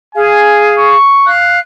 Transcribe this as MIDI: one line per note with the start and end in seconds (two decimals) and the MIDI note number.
0.15 0.96 68
0.15 0.96 77
0.15 0.65 80
0.79 1.30 85
1.26 1.59 77
1.26 1.59 90